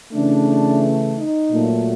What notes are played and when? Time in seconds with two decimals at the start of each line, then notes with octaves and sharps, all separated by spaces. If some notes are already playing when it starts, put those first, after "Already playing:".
0.12 C#3 E3 A3 D4
1.16 D#4
1.51 A#2 F#3 A3